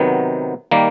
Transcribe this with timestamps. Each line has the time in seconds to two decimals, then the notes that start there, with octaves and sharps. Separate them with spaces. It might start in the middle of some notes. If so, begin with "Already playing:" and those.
Already playing: C3 D#3 F#3 B3
0.71 D#3 G3 A#3